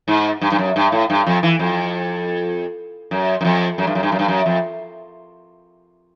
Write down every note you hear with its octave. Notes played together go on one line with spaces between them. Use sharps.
G#2
G2
G2
F#2
G2
A2
G2
F2
E3
F2
F#2
F#2
F2
F#2
G2
F#2
G2
F#2
G2
F#2
F2